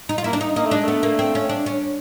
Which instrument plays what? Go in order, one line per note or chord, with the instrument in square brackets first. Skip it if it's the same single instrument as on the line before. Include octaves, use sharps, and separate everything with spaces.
[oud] D#4
F4
[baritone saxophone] A#3 [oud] E4
[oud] D4
D#4
[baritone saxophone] A#3 [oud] D#4
[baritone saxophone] A3
[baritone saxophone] G#3 [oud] D4
[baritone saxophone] A3 [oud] B3
[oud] A#3
C4
C#4
D4
C#4